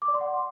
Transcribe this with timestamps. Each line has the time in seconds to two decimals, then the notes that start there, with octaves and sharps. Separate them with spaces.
0.02 D6
0.08 D5
0.14 C6
0.21 F#5